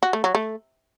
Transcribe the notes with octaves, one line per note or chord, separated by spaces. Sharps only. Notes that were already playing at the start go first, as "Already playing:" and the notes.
F#4
A3
F#3
A3